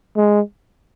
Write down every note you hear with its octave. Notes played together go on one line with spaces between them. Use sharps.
G#3